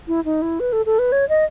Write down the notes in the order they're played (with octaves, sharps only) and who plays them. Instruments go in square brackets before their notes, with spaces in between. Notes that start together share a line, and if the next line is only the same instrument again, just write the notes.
[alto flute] E4
D#4
E4
B4
A4
A4
B4
C#5
D#5